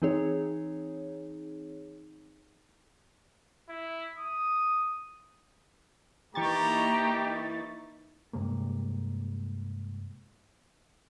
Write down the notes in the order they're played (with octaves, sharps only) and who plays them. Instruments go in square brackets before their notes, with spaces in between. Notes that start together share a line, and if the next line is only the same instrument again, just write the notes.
[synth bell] E3 C4 D#4 G#4 C#5
[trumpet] E4
D#6
[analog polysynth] E3 C#6 A6 [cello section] A#3 D#4 E4 [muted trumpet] G4 [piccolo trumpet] A#5
[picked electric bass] G2 C3 G#3 A#3